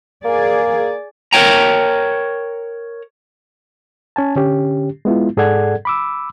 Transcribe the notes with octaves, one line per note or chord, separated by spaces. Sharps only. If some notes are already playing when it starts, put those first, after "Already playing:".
A#3 G#4 D5
A#4 B4 C#5 G5 A#5
C#4 G#5 A5
D3 C#4 G4
G#3 B3 E4 F4
G#2 G#4 A4 D5 F#5 G#6
B5 D6 E6